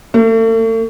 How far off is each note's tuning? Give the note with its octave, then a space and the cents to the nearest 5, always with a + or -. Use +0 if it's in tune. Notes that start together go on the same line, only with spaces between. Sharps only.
A3 +40